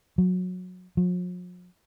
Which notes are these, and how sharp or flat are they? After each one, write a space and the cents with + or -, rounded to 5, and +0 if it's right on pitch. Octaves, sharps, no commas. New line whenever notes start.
F#3 -20
F3 +45